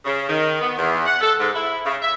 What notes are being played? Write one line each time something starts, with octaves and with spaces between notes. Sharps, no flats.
C#3
D#3
B3
E2
F#5
A4
G#2
E4
C#3
E5